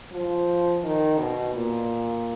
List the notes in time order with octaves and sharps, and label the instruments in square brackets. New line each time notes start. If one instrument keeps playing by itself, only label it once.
[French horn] F3
D#3
B2
A#2